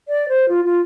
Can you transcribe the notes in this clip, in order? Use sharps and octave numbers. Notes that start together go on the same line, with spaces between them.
D5
C5
F4
F4